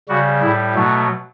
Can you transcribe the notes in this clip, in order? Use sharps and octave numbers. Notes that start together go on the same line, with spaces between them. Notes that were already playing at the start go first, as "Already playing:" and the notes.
C#3 G3 F#4
A2 G3 E4
B2 F#3 A3